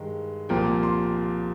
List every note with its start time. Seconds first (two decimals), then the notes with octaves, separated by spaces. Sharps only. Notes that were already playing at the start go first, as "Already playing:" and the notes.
Already playing: G2 D#3 G#3
0.49 C2 A#2 F3 A#3 G5
0.83 C6